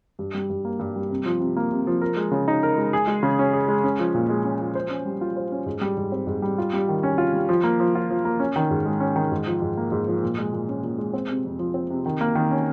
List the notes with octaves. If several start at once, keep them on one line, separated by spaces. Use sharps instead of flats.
G2
G3
G2
A#3
G2
G3
C3
F3
C3
A#3
C3
F3
A#4
G#3
C#3
D#4
A#4
G#3
G#4
G#3
C#3
C#4
G#4
G#3
C#4
F3
A#2
G#3
C#4
F3
C5
C#4
G3
F4
C5
C#4
G#2
G3
G#2
C4
G#2
G3
F4
G3
D#3
C#4
F4
G3
F3
A#3
F3
F4
F3
A#3
C#4
D#3
G#2
G#3
C#4
D#3
G#2
F3
G#2
A#3
G#2
F3
A#2
G#3
A#2
C#4
A#2
G#3
C4
C3
F2
F3
C4
C3
D#3
A#3
D#3
C#4